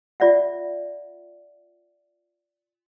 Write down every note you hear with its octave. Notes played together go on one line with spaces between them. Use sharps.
F4 D5 E5 F#5